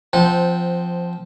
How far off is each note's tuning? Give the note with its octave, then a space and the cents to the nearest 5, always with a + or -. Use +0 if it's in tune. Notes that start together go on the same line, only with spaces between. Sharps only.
F3 +0 C4 -10 F#5 -30